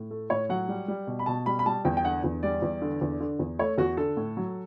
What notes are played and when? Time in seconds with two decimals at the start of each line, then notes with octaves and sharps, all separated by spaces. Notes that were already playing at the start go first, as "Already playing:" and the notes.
Already playing: A2
0.11 A3
0.30 A2 C#5
0.49 F#3 F#5
0.69 G3
0.88 G3
1.07 B2
1.19 B5
1.26 B2 A5
1.46 G3 B5
1.59 B5
1.66 G3 A5
1.85 E2 G5
1.97 G5
2.04 D3 F#5
2.24 E2
2.43 G3 D5
2.62 E2
2.82 D3
3.01 E2
3.20 D3
3.39 E2
3.59 A3 C#5
3.78 E2 F#4
3.97 D3 A4
4.17 A2
4.37 F#3